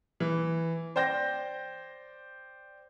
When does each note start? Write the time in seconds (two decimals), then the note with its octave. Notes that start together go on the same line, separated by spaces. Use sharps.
0.20 E3
0.96 C5 D5 G5 G6 A#6